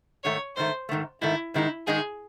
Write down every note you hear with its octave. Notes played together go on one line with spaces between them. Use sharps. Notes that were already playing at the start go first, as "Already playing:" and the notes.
G#2 D#3 A3 C#5
G#2 D#3 A3 C5
G#2 D#3 A3
G#2 D#3 A3 E4
G#2 D#3 G#3 D#4 E4
G#2 D#3 G#3 D#4 G#4